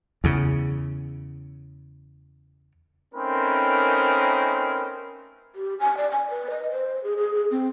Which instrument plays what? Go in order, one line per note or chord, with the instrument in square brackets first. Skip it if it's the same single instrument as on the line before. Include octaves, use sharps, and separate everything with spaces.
[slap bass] E2 C#3
[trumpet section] A3 C4 C#4 D#4 A#4 B4
[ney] G4
G#5
D5
G#5
B4
D#5
C5
G#4
G#4
G#4
C4